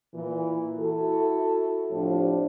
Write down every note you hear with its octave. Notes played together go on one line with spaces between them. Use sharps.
A#2 E3
E4 F#4 A4
A2 C3 F3 D4